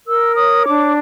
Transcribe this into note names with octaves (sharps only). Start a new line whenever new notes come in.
A#4 E6
C#5 D#6
D4 D6